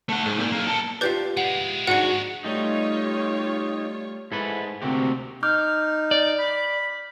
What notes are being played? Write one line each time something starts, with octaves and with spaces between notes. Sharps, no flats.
A3 F#5
G#2
A#2
B1 A#3
A4 A#4
F4 G4 B4 D5 G6
G#3 E4 F#5
G#2 D4 F#4 F#5 C#7
G3 A3 D#4 F4 G4 C#5
G#2 E4 A4 B4
D2 C3 A#3 C4 F#4 G4
D#4 D6 F6 G6
D5
B5